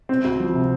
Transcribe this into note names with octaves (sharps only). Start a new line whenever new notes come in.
C4
D2
F3
C3